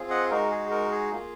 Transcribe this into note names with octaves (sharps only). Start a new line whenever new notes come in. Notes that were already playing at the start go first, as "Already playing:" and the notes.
Already playing: C4 F4 G#4
D#5 F#5
G#3 D#4 F#4 A#4
G#4
A#4
G#4
A#3 F4 G#4